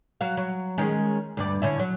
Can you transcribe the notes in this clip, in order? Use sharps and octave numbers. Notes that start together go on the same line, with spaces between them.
F#3 F#4 F5
F#3
D#3 G#3 C#4
D2 G2 D5
D3 C#4 E4
F#3